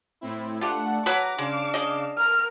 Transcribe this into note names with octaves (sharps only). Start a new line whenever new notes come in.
A2 C4 E4
A3 D4 F4 G4 F#5 A5
F#3 B4 A#5 B5 D6
C#3 G#3 D4 F5 E7
G#4 D#5
A#4 F6